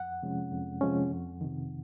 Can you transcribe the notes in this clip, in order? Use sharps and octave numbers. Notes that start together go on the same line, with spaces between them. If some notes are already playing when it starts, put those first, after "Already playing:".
Already playing: F2 F#5
C3 F3 G#3 C#4
F2
C3 F3 G#3 C#4
F2
C3 D#3